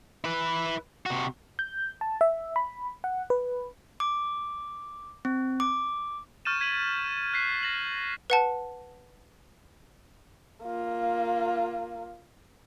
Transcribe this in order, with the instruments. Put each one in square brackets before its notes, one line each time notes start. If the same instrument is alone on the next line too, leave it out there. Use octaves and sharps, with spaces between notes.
[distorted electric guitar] E4 B4
C3 F#4
[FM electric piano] G6
A5
E5
B5
F#5
B4
[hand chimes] D6
C4
D6
[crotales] C#6 F6 G6 A6 D#7 E7
G#6 B6 D#7 F#7
F#6 G#6 B6 C7
A#6 E7 F#7
[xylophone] B4 F#5 A5
[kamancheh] A#3 F4